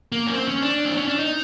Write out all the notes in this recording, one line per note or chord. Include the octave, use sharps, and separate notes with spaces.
A#3
C#4
C4
C#4
D4
C4
C#4
D4
D#4